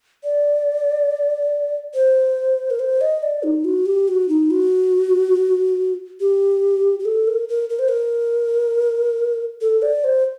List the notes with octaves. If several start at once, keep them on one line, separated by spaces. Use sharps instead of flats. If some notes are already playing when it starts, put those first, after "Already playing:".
D5
C5
A#4
C5
D#5
D5
D#4
F#4
G4
F#4
D#4
F#4
G4
G4
A4
A#4
A#4
A#4
C5
A#4
A4
D5
C5